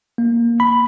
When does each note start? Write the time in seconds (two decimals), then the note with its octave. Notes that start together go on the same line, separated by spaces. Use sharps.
0.18 A#3
0.60 B5